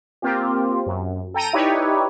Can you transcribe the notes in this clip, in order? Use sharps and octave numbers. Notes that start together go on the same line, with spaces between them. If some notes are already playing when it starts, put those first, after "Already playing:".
A#3 C4 F4 G4
F#2
A4 G5 A#5 D#7
D#4 E4 G4 B4 C#5 D5